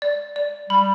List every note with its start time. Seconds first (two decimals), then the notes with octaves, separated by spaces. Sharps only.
0.02 D5
0.36 D5
0.70 G3 B5